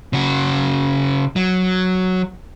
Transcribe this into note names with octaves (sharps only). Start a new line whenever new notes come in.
C#3 F#4
F#3